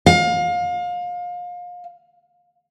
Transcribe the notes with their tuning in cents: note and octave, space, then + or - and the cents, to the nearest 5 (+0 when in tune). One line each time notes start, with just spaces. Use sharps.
F5 +30